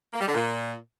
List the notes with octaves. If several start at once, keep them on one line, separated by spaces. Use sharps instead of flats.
A#3
G3
D3
A#2